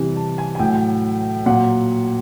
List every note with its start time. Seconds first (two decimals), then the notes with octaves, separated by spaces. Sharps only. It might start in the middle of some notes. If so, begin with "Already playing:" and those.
Already playing: C3 E3 G3
0.16 A5
0.38 G#5
0.55 G#5
0.59 A2 F#3 G5
1.46 A#2 F#3 F#5